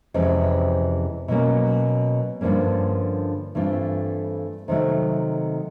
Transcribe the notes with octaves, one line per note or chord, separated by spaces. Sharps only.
F2 C3 E3 G#3 C#4
B2 F#3 A#3 C#4
G2 D3 F3 A#3 C#4
G2 E3 A3 C4 F4
C3 D#3 F#3 A3